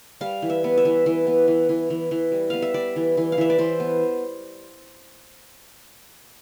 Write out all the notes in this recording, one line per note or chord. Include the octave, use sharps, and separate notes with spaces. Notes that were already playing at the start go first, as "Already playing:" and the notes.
G3 F5
E3
E5
B3
E5
E3
E3
B3
E3
E3
E3
E3
G3
B3 F5
E5
G3 D5
E3
E3
F5
E3 E5
D5
E3 C5
B3